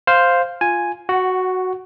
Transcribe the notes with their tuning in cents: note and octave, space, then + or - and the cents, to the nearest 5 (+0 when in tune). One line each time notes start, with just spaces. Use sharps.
C5 +0 F5 +0
F4 +0 G#5 +0
F#4 +0 F#5 +20